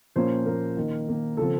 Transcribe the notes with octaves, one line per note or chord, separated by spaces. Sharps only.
A#2 F3 A#3 C#4 C5
A#2 F3 A#3 C#4 A#4
D#3 A#3 D#4
D#3 A#3 D#4
C#3 F3 C4 A4